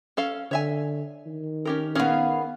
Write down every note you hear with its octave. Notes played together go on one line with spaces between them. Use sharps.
C#4 A4 F5
D3 C#5 E5 G#5
D#3
C#4 G4 A#4
B3 C#4 G#4 A#4 F5